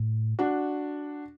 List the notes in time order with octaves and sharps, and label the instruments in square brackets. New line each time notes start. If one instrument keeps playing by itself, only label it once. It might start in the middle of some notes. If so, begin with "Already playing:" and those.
Already playing: [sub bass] A2
[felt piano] D4 F#4